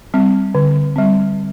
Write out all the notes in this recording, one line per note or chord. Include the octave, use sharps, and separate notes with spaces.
G3 C4
D3
G3 C4